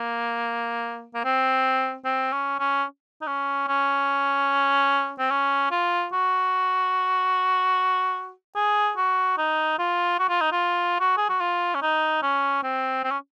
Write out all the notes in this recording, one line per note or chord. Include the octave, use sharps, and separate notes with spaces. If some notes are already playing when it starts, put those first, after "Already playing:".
Already playing: A#3
A#3
C4
C4
C#4
C#4
D#4
C#4
C#4
C4
C#4
F4
F#4
G#4
F#4
D#4
F4
F#4
F4
D#4
F4
F#4
G#4
F#4
F4
C#4
D#4
C#4
C4
C4
C#4